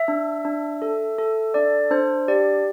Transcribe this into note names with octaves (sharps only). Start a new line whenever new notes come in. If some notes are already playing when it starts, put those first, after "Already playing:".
Already playing: E5
D4
D4
A4
A4
D4 D5
D4 C5
G4 D5